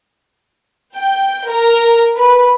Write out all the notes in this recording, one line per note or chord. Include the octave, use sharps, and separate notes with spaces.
G5
A#4
B4